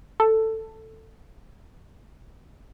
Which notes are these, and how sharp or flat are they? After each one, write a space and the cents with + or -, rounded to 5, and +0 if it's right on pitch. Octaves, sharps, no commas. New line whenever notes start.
A4 +10